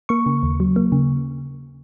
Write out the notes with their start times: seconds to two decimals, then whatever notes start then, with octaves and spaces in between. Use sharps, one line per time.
0.09 A#3 C#6
0.26 C#3
0.43 D#2
0.60 F#3
0.76 A#3
0.92 C#3